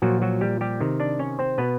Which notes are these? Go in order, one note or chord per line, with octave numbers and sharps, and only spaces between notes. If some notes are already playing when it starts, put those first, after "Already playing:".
A#2 F3 F#3 F#4
F#3 F#4
G3 G4
G3 G4
C3 D#3
D4 D5
C#4 C#5
C4 C5
B2 B3 B4